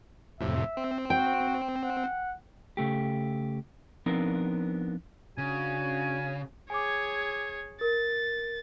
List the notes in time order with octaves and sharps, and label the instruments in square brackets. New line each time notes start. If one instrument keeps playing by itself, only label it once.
[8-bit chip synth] F2 A2 C3 [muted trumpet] E5
[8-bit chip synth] C4
[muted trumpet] F#4 [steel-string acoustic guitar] G5
[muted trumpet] F#5
[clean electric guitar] C#3 A3 G4
F3 B3 C4 D4 D#4 A#4
[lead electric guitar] C#3 [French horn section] C#4 D4 F#4 [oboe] G#5
[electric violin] G#4 C#5 [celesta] G#5 D6
[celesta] A#4 [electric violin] A6